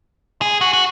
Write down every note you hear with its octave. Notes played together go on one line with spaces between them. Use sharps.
G#4
F#4
F#4